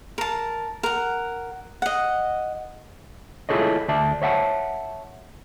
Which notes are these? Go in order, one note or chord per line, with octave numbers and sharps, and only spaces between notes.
A#4 A5
A#4 F#5
D#5 F#5
E4 F4 G#4 A4 C#5 D#5
D2 D5 E5 A5
C#5 E5 F#5 A5